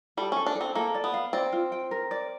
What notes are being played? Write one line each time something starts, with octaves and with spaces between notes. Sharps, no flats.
G3 A4
C#4 A4
D4
A4
C4
A#3 A4
D5
B3
F5
C4 D5
F4
G5
A#4
D5